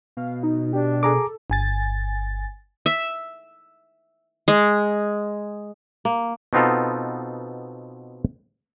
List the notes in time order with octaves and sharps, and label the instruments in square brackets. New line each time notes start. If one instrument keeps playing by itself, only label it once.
[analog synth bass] B2 [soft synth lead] F5
[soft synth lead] D#4
[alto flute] D4 [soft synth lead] G4
[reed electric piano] G#4 A#5 D6 [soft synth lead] A4
[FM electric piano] G1 G#5 A6
[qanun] E5
G#3
[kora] A#3
[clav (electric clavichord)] B2 B3 C4 D#4 F4 A4